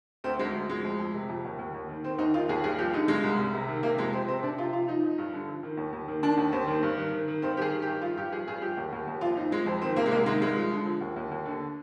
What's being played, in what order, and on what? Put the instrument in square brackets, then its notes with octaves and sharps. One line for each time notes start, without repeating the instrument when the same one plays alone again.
[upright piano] D2 C4
D2 G#3
D2
F3 G#3
F2
F2
C3
F2
D#2
D#2
D#2
D#3
D#3 C4
D#2 D#4
D#3 F4
D#2 G#4
G2 G#4
F3 G4
D3 D#4
G2 G#3
C2
C2
C3
D#3
C3 A#3
F2 G#3
F3 C4
C3 C4
C3 D4
C3 F4
F3 F4
F3 D#4
F3
G2
D3
F3
D#3
D#2
D#2
D#3
D#3 D4
D#2
D#2 C4
D#3
G2
D#3
D#3
D#3
G2 C4
D#3 G4 G#4
D#3
G4
G2
F3 F4
G2 G4
F3 G#4
G2 G#4
F3 G4
D#2
D#2
D#2
F2 F4
F2 D#4
F3 G#3
F2 C4
D#3 C4
C3 A#3
G#3
C2 A#3
D#3 G#3
G2 G#3
F3
D3
F3
D#2
D#2
D#2
D3